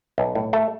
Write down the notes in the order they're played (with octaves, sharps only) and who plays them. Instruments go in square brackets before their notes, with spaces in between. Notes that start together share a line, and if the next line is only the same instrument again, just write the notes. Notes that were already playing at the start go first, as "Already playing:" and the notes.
[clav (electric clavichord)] B1
A2
A3